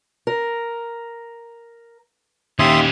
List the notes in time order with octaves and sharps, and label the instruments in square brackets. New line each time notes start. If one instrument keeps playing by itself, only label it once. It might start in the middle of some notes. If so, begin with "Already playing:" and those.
[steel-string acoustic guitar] A#4
[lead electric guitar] D#2 [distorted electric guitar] C#4 G4 [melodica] E5 C6 D#6